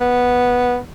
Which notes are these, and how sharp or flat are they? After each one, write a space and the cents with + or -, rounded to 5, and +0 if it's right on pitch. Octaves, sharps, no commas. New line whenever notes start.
B3 -5